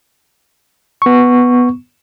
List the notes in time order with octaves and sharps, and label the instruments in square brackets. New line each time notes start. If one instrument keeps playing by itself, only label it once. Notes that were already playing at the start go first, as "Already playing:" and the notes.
[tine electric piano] B3 C#6